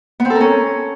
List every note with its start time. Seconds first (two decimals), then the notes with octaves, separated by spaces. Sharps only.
0.20 B3
0.25 C4
0.30 A4
0.35 A#4
0.41 C#4